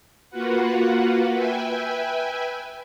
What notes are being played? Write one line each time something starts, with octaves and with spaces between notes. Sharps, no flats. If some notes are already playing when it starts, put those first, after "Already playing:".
A#3 F4 F#4 B4 F#5
B4 E5 G5 G#5